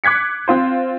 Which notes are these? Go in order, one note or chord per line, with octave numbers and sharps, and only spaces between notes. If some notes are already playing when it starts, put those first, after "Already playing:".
D6 F#6 G#6 B6 C#7
C4 F4 C5